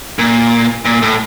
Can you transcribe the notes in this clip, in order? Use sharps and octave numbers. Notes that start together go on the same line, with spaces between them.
A#2
A#2
A2